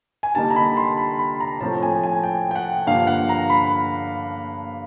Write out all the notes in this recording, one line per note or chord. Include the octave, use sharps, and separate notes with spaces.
G#5
D3 G3 A#3 D#4 A5
A#5
B5
C6
B5
B5
A#5
A2 F3 A3 C4 A5
G#5
G#5
G5
G5
F#5
G2 D3 F3 A#3 D4 F5
F#5
A#5
B5